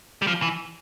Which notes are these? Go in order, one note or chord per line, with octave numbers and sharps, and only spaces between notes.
G3
F3
E3